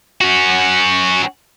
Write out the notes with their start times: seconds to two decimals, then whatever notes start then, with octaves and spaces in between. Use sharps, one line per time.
0.21 C#4 F#4